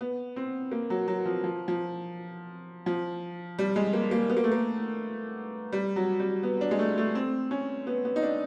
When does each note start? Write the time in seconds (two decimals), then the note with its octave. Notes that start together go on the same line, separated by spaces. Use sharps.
0.01 B3
0.36 C4
0.71 A#3
0.90 F#3
1.08 F#3
1.26 F3
1.44 F3
1.68 F3
2.86 F3
3.59 G3
3.76 G#3
3.93 A#3
4.11 A#3
4.30 B3
4.37 A#3
4.44 A3
4.52 A#3
5.72 G3
5.96 F#3
6.19 G3
6.43 B3
6.61 D4
6.71 G#3
6.79 A3
6.98 A3
7.15 C4
7.51 C#4
7.87 B3
8.05 B3
8.16 D#4
8.23 D4